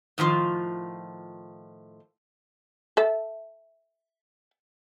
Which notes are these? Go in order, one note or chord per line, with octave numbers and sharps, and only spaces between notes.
A2 D#3 F3 F4
A4 E5